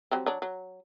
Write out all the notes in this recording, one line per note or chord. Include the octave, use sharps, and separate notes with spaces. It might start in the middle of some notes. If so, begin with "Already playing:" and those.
F#3 G3 C4
F#3 D4
F#3